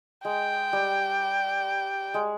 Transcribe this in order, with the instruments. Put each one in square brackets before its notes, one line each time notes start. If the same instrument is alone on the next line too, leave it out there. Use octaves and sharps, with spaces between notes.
[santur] G#3 [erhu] G5
[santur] G3
G#3